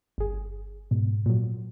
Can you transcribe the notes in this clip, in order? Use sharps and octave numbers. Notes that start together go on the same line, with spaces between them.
G1 G#4
G#2 B2
A#2 F#3